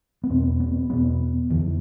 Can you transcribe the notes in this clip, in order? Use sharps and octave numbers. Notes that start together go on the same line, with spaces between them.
B3
E2 B2 C4
B3
E2 B2 B3
F2 D3 E3